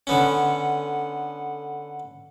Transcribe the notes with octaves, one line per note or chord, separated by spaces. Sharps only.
D3 B3 C#4